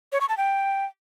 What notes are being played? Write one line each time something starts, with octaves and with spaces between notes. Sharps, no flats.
C#5
C#6
A5
G5